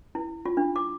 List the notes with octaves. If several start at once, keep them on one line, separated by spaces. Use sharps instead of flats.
E4
F4
D4
D6